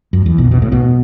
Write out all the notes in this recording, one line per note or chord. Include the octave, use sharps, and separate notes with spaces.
F#2
E2
B1 B2
B2
A2
B1 B2